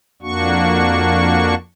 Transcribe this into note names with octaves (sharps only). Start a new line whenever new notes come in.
F2 A#3 D4 F#4 C#6